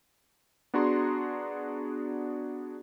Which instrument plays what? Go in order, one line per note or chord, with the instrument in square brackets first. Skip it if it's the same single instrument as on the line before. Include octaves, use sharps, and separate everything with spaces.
[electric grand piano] B3 D4 F#4 G#4 A#5 C6